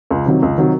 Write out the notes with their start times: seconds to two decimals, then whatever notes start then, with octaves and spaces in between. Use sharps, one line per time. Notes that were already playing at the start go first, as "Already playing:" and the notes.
0.11 C#2
0.26 C3 D#3 F#3
0.42 C#2
0.58 C3 D#3 F#3